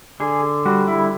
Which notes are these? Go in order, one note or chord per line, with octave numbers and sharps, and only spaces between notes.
D3 G#4
G3 F#4
E4